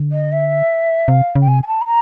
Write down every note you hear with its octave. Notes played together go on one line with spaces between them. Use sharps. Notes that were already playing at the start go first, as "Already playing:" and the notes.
Already playing: D3
D#5
E5
C3 F5
C#3
G5
C3 G#5
G#5
A5
B5
A#5